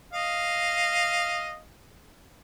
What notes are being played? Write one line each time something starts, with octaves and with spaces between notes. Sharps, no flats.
D#5 F5